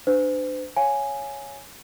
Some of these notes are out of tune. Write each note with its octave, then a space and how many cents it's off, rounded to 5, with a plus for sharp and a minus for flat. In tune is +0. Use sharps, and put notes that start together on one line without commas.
D4 +15 C5 -40
C#5 +0 F5 +0 G#5 +0